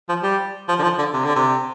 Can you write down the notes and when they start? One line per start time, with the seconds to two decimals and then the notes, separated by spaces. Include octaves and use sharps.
0.09 F3
0.23 G3
0.69 F3
0.79 D3
0.83 F3
0.98 D3
1.13 C3
1.25 D3
1.36 C3